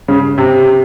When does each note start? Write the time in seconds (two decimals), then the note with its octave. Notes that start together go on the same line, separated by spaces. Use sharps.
0.08 C#3
0.38 C3